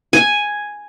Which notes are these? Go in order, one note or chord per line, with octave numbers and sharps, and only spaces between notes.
G#5